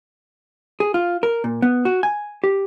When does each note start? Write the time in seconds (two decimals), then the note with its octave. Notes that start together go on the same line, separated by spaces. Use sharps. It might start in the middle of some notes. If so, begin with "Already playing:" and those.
0.80 G#4
0.94 F4
1.23 A#4
1.44 A#2
1.62 B3
1.85 F#4
2.03 G#5
2.44 G4